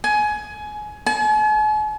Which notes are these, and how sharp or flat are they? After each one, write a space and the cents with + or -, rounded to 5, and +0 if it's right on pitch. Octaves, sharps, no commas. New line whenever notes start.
G#5 +25
G#5 +45